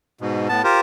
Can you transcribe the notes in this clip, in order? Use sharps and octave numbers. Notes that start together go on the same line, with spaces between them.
G#2 B2
A2 B3 A5
F4 G4 A#4 C5